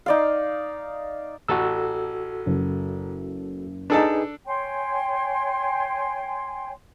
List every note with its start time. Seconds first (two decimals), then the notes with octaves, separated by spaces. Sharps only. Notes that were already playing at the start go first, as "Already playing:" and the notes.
0.06 D#4 D5 F5
1.48 A1 F#4 A4 E6
2.46 F#1
3.90 D4 D#4 G#4 A4 B4 A5
4.47 C#5 G5 G#5 C6